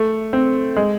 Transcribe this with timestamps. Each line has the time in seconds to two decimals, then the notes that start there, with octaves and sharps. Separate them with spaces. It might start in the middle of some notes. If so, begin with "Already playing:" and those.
Already playing: A3
0.33 C4
0.76 G#3